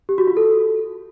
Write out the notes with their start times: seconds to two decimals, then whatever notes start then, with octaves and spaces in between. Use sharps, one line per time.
0.09 G4
0.18 F#4
0.27 F4
0.37 A4